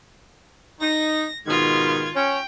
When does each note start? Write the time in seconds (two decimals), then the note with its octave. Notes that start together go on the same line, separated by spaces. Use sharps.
0.81 D#4 A#6
1.47 G#2 B2 D#3 F4 G#6
2.16 C#4 G5